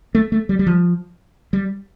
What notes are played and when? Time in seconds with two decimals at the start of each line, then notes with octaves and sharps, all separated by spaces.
0.15 A3
0.32 A3
0.49 G3
0.59 G3
0.67 F3
1.53 G3